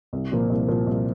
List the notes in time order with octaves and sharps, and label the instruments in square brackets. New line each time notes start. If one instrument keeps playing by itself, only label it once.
[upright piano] C2
A#2 F3 A#3
C2
A#2 F3 A#3
C2